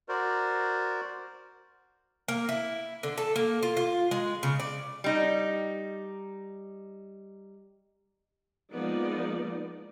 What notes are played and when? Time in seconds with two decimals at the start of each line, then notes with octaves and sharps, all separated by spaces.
0.09 F#4 A#4 C5 D5
2.28 A#3
2.49 E4
3.03 D3
3.18 A4
3.36 A#3
3.63 F4
3.77 F4
4.11 G#3
4.43 C#3
4.60 D5
5.04 G3 D#4
8.72 F3 G#3 A#3 B3 D#4 D5